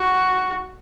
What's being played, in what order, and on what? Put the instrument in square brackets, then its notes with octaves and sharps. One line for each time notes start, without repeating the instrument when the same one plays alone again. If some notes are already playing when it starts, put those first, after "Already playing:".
Already playing: [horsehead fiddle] F#4